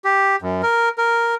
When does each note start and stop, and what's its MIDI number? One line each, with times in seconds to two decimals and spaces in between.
0.05 0.36 67
0.42 0.62 42
0.63 0.89 70
0.98 1.35 70